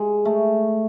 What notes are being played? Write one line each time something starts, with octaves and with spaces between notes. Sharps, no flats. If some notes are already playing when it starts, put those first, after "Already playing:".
Already playing: G#3
A3